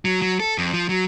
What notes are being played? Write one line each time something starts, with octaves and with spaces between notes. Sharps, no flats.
F#3
F#3
A4
F2
F3
F#3